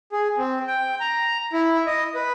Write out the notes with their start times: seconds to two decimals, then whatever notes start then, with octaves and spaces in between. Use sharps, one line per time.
0.12 G#4
0.38 C4
0.67 G5
1.00 A#5
1.53 E4
1.87 D#5
2.15 B4